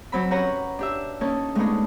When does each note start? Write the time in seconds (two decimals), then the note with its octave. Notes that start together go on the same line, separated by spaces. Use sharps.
0.12 F#3 C4 B5
0.31 C#4 G4 B4 C#5 F#5 A#5
0.79 D4 G4 E5
1.21 A#3 C#4 D#4 A4
1.55 G#3 A3 B3 D4 D#4